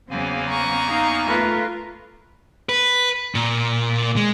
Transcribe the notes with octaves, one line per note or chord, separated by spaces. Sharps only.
E2 C#3 F#3 A#3 C4 G#5
A#5 C#6
D#4 F5
A3 F4 A#4 B4
B4
A#2
G#3